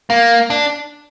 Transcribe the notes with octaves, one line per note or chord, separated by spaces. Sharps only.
A#3
D4